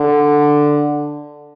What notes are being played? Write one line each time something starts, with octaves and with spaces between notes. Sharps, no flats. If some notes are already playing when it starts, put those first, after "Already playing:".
Already playing: D3